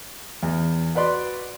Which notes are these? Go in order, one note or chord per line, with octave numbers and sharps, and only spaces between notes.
E2
F#4 B4 D5 C6